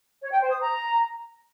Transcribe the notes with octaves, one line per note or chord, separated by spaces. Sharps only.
C#5
G5
C5
D#6
A#5